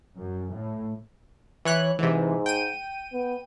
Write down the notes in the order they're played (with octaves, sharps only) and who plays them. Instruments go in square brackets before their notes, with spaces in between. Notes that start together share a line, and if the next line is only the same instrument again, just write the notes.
[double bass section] F#2
A2
[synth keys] E3 C#5 F#6
[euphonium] G#2 [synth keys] C3 E3
[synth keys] G5 D#7
[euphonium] B3